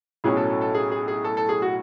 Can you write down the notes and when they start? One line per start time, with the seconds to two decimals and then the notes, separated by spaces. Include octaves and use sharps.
0.24 B1 A2 F#3 C#4 G#4
0.37 A4
0.50 A4
0.61 A4
0.74 G#4
0.92 G#4
1.08 G#4
1.24 A4
1.37 A4
1.49 G#4
1.62 F#4